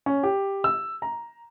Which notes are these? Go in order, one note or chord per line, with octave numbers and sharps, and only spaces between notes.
C#4
G4
E6
A#5